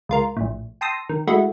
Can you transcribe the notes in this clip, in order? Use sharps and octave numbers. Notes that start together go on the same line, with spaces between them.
C#2 F4 A#4
A#1 A2
G5 A5 C6 D#6 E6 A#6
D#3
G#3 A3 E4 F#4